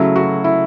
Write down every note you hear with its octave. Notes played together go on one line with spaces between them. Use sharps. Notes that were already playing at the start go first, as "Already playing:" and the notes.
Already playing: C#3 F#3 A3 E4
F#4
E4